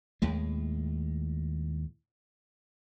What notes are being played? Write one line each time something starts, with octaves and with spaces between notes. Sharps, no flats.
D#2 A2 G#3